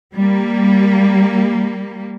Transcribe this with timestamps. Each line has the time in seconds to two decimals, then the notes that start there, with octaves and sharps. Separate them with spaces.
0.14 G3 A#3